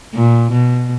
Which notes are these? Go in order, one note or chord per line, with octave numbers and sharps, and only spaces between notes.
A#2
B2